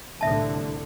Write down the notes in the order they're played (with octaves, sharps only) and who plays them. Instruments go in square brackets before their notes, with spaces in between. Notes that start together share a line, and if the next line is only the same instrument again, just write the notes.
[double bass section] C2 A2 D3 [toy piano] E5 A5